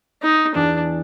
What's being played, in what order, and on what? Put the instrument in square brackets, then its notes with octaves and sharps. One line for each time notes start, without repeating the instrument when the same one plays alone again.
[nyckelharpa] D#4
[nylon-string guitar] E2 E3 [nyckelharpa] D4